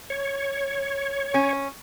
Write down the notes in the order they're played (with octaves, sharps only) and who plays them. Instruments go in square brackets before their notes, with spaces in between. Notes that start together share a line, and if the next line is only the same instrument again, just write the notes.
[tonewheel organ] C#5
[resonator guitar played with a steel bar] C#4